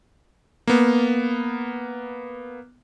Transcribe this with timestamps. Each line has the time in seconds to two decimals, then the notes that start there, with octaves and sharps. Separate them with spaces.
0.67 A#3 B3